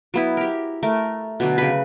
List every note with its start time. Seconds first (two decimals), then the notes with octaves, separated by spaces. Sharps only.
0.14 F#3 B3 E4
0.37 G4 A#4
0.83 A3 A#4
1.40 B2 D3 F#3
1.58 C#3 B4